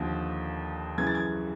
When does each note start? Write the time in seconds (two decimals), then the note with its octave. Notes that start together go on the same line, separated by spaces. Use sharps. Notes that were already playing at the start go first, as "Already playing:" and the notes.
Already playing: D#2 D3 F3
0.98 F#2 C#3 E3 G#6
1.07 A6
1.15 G#6